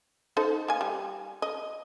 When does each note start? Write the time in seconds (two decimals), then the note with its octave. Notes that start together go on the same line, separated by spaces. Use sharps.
0.37 D#4 A4 C5
0.68 A#3 G#5
0.81 G3
1.42 D#5